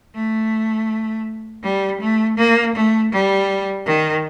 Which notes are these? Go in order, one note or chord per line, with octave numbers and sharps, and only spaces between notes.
A3
G3
A3
A#3
A3
G3
D#3